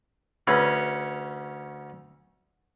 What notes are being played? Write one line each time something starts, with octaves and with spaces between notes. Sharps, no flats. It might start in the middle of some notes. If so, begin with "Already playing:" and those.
D2 C#4 G#4 B4 C#5 D#6